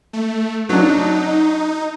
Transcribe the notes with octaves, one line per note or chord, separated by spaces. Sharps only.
A3
F#3 D4 D#4